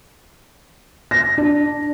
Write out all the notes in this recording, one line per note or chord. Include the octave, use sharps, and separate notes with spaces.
A#6
D4